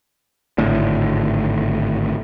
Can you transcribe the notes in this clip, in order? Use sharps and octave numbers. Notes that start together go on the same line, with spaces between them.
G#1 A2 D3